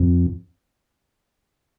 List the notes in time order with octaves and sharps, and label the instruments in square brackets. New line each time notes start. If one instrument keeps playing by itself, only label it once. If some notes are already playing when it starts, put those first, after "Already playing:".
Already playing: [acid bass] F2